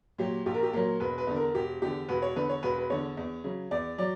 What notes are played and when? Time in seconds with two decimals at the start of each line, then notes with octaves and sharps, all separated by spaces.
0.18 A#2 F#3 G4
0.46 A#1 G4
0.54 A#4
0.63 G4
0.73 A#2 F#3 A#4
1.00 E1 B4
1.18 B4
1.27 E2 D3
1.36 A#4
1.54 E1 G4
1.82 E2 D3 G4
2.08 E1 B4
2.22 C#5
2.36 E2 D3 B4
2.49 C#5
2.63 E1 B4
2.78 B4
2.90 E2 D3 C#5
3.17 E2
3.44 C#3 F#3
3.71 E2 D5
3.98 F#3 D5